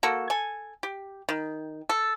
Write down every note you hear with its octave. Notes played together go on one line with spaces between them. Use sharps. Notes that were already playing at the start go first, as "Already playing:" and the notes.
A#3 F#4 A4
A4 G#5
G4
D#3
A4